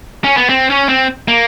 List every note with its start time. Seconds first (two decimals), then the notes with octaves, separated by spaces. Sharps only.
0.24 C#4
0.37 B3
0.49 C4
0.70 C#4
0.89 C4
1.28 A#3